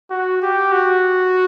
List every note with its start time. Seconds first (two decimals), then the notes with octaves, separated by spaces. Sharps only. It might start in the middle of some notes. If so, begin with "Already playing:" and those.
0.10 F#4
0.42 G4
0.72 F#4